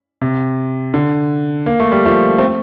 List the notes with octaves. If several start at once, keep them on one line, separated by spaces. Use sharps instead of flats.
C3
D3
A#3
A3
G3
F3 A3
A3 C4